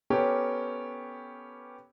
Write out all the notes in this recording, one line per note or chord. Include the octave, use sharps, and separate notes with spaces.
B3 C#4 G4 A4 A#4